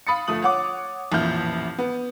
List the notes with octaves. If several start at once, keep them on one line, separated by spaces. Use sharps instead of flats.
F5 B5 D#6 A6 C#7
G1 F3 A3 D#6 F#7
C#5 F#5 D6
A1 F2 A#2 E4 F6 G6
B3